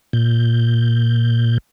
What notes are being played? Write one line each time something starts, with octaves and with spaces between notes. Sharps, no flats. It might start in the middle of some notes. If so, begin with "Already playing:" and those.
A#2 G6